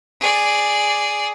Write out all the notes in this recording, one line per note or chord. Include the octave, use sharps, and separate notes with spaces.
G#4 D5